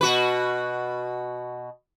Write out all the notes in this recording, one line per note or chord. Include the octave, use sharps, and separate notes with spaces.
B2 F#4 B4